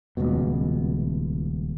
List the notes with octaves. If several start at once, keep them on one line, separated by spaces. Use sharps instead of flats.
D#1 G#1 C#2 B2